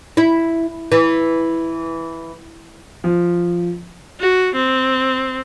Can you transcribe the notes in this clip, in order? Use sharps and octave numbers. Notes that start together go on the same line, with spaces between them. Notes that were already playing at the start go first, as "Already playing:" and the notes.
E4
E3
F3
F#4
C4